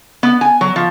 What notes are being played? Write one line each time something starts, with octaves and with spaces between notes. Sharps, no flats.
B3
G#5
F#3
F3